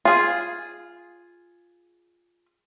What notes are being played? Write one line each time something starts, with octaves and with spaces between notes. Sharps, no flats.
F4 G#4